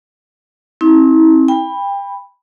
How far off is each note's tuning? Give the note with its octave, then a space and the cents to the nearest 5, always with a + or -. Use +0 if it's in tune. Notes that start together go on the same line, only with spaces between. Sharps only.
C4 +30 E4 -40
G5 +30 B5 +0